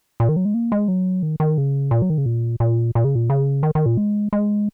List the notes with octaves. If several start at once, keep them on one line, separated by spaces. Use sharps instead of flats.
A#2
D#3
F#3
G#3
A#3
G#3
F#3
D#3
D#3
C#3
A#2
F#3
D#3
C#3
A#2
A#2
A#2
C#3
A#2
C#3
D#3
D#3
A#2
G#3
G#3